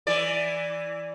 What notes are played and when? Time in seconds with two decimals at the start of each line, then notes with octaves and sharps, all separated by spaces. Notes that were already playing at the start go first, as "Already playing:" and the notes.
0.07 E3 D5